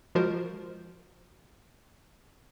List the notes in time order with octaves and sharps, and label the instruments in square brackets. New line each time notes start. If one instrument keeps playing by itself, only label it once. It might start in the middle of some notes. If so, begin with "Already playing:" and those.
[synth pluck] F3 G#3 F4 F#4 A#4 C5